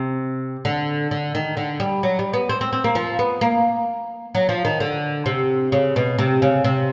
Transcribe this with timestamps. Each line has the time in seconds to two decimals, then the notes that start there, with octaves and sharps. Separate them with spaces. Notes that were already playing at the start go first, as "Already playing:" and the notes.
Already playing: C3
0.65 D3
1.11 D3
1.35 D#3
1.57 D3
1.80 G3
2.03 F#3
2.19 G3
2.33 B3
2.49 C4
2.61 C4
2.73 C4
2.84 A#3
2.95 F3
3.19 B3
3.41 A#3
4.35 F#3
4.49 F3
4.65 D#3
4.80 D3
5.26 C3
5.72 C#3
5.96 B2
6.18 C3
6.42 C#3
6.64 C3